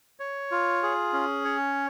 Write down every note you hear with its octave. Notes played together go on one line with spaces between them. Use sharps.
C#5
F4
G#4
C#4
C#5